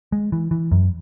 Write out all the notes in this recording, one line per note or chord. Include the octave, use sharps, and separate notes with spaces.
G#3
E3
E3
F#2